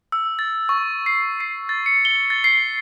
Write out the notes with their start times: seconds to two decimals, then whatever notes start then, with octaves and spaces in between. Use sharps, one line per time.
0.12 E6
0.39 A6
0.69 C#6
1.06 C7
1.40 C7
1.69 A6
1.86 C#7
2.05 G7
2.30 A6
2.44 C7